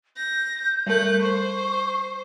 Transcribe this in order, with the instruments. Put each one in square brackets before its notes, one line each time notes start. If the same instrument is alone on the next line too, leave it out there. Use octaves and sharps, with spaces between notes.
[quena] G6 [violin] A#6
[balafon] G3 A#4 [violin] A3 F#6
[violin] C5 [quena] C#6